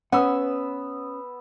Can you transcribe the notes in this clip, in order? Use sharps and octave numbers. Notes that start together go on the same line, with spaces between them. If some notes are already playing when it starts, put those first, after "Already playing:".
B3 C#4 F#5 E6